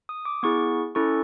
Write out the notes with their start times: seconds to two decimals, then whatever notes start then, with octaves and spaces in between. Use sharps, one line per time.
0.09 D#6
0.25 D6
0.43 B3 E4 G#4 C#6
0.95 C#4 E4 A4 C#6